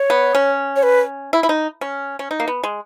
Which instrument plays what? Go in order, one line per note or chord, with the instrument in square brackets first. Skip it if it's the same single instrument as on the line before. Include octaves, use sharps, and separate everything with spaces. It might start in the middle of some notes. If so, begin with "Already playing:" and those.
Already playing: [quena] C#5
[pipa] B3
C#4
[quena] C#5
B4
[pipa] E4
E4
D#4
C#4
C#4
D#4
A#3
B3
G#3